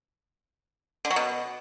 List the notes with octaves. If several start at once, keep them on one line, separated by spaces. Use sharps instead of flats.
D3
F#3
B2